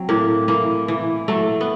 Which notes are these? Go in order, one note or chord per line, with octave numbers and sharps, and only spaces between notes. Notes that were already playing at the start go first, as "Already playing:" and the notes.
Already playing: F#3 C4
A2 A#3
E3 A#3
E3
F#3 A3
B3